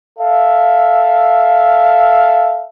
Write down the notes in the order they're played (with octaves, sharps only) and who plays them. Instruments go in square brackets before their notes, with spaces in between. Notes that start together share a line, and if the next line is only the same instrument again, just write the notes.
[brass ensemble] A4 E5 F5